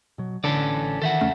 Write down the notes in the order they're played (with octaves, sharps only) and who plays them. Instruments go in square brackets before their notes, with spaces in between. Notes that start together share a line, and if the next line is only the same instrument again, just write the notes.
[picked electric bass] B2 F#3
[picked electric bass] A1 E3 D4 [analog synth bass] D3 [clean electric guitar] C#4 A4 D5
[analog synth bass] D#3 [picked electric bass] E3 [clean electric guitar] A4 E5 F#5
[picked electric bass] E2 C#3 C#4 [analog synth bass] A3